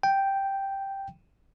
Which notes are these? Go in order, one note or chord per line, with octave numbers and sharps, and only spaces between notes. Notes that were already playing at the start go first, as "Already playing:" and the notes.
G5